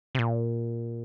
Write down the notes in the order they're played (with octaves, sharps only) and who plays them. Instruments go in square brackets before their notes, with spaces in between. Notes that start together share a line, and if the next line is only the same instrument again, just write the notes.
[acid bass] C3
A#2